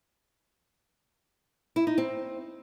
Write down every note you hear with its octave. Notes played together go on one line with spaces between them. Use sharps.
E4
D#4
C4